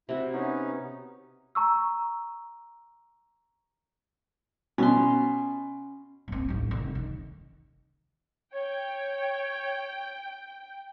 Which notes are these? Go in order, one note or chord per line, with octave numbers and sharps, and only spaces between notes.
C3 E4 F#4
B3 C#4 D#4
A#5 C#6 E6
B2 C#4 C6
A#3 C4
A1 D#2
F1
D#3
C#5 G5